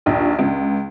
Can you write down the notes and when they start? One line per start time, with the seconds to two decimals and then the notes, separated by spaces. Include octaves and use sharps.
0.06 A#1 D#2
0.39 C#2